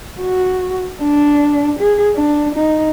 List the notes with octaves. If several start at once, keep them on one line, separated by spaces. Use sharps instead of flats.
F#4
D4
G#4
D4
D#4